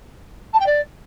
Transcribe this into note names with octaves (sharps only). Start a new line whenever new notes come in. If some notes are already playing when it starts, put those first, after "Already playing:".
A5
G5
D5